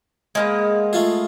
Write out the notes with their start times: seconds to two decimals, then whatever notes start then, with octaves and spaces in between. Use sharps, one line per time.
0.35 G#3 A#3 B3
0.93 A3 F4 G#4